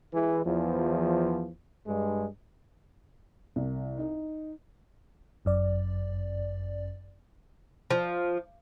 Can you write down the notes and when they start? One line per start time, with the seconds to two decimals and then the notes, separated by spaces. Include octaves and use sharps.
0.13 E3 G#3
0.45 E2 F3
1.87 G2 G#3
3.56 C2
3.98 D#4
5.45 G1 F#2 D5
7.91 F3